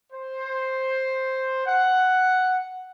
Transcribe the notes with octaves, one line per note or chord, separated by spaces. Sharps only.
C5
F#5